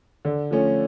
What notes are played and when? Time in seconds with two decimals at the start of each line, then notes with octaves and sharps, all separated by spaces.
0.25 D3
0.51 F3 A3 C#4